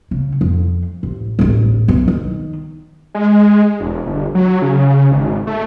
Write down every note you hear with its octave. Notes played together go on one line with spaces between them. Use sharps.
C#3
F2
A1
D1 A1
B1 F#2
D#3
G#3
E1
G1
F#3
C#3
G#1
A3